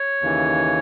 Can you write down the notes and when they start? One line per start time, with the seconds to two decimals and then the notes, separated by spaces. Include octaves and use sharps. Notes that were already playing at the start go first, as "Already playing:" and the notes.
Already playing: C#5
0.22 D#2 C#3 E3